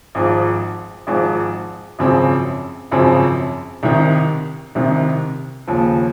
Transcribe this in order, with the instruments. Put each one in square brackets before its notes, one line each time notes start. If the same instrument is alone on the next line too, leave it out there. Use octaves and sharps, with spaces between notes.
[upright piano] G#1 G#2 F3
G#1 G#2 F3
G#1 F#2 C#3 F3 C4
G#1 F#2 C#3 F3 C4
C2 C3 D#3
C2 C3 D#3
D#2 C#3 F3